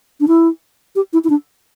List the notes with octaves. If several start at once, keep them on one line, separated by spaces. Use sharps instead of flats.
D4
E4
G4
E4
E4
D4